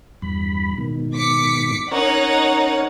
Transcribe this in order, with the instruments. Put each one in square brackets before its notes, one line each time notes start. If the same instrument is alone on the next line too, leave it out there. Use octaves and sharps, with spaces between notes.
[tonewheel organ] E2 G2 B5
G#2 B2 D#3
[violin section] D6 B6 C#7
[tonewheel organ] C#4 A#4 C#5 [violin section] D#4 F#5